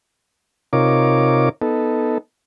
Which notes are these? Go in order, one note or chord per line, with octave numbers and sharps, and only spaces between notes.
C3 D#4 F4 A#4 C#5 D6
B3 D#4 A4